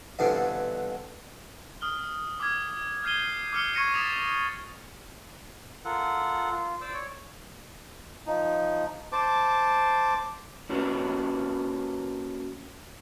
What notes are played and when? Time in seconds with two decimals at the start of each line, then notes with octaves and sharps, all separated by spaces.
0.19 E2 G2 B2 D3 C4 D4
1.81 D#6 F6 G7
2.40 D6 E6 F6 G#6
3.03 F6 G6 G#6 C7 D#7 G7
3.53 D6 E6 F6 C7 C#7 G7
3.74 C#6 G#6 A#6 C#7 D#7
3.94 D#6 G#6 A6 B6 E7 F7
5.85 F4 A4 A#4 F#5
6.50 F4
6.81 C5 D5 D6 E6
6.93 C#5
8.27 F3 D#4
9.12 C5 A5 D6
10.69 A#3 C#4 F#4 G4 B4